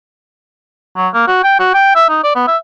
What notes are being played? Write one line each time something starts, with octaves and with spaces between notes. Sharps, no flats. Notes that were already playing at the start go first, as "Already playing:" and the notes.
F#3
A#3
F#4
G5
F#4
G5
E5
D#4
D5
B3
E5